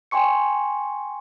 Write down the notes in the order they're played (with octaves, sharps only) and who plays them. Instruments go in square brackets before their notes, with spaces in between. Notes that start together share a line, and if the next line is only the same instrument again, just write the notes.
[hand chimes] G5 G#5 C6 C#6 C#7